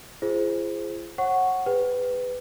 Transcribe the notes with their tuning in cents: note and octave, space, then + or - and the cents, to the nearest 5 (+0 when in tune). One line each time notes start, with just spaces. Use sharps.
F4 -45 G#4 +0 C5 +0
C#5 -40 F#5 +5 C#6 +0
G#4 -35 B4 +15 G5 +0